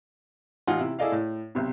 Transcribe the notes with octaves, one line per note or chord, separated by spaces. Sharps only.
A1 D#4 F4 F#5 G#5
C3 E4
E4 G#4 A4 D5 D#5 F5
A2
B1 C3